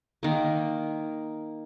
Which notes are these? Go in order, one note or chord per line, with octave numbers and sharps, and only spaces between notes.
D#3 A#3